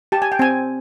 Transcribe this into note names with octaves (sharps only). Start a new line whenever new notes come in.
G4 A5
G#5
G5
C4 G#5